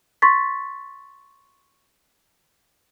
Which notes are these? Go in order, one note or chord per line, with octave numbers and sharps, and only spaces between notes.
C6 C#6 A6 B6